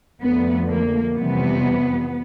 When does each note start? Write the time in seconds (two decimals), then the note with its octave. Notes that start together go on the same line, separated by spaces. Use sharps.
0.21 F2 D3 F3 A3 B3
0.69 A#3
1.15 F2 C3 E3 G3 B3